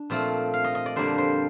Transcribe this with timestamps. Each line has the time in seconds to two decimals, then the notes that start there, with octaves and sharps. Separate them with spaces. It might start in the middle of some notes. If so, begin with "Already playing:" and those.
Already playing: D4
0.10 A#2 F3 A3 C4
0.53 F5
0.64 D#5
0.75 D#5
0.86 D5
0.96 F2 D3 G3 A#3 D4 C5
1.18 C5